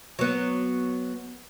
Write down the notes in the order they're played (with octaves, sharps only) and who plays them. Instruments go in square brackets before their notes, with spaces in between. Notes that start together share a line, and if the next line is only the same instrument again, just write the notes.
[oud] F#3 B3